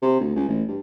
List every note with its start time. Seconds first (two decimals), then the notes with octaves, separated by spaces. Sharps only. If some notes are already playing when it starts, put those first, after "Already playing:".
0.02 C3
0.20 D2
0.36 C#2
0.49 A1
0.68 G2